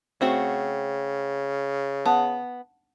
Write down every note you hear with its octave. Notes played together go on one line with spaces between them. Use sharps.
C#3 A3 C4 F#4
B3 F#5 A5 D#6